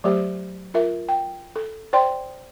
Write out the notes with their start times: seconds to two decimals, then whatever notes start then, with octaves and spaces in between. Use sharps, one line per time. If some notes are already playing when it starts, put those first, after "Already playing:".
0.04 F#3 A3 G4 C5
0.74 F4 A#4 E5
1.09 G5
1.56 A4
1.93 C5 D5 G5 C6